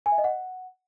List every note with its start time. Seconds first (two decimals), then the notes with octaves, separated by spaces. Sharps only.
0.06 G#5
0.12 E5
0.18 D#5
0.24 F#5